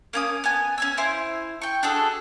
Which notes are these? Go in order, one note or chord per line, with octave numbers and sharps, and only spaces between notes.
A#3 C#4 D#6
B3 G#5
C#4 G#5 E6
E4 C5
G5 C#6
D4 F#4 G#4 A4